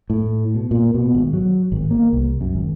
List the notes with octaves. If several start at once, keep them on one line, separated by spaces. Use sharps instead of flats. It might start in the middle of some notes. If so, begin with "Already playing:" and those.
A2
B2
A#2
B2
G#1
F#3
G#1
A#3
C2
F#2
G#1